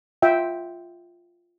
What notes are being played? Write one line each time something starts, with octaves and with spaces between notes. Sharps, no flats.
F4 E5 G5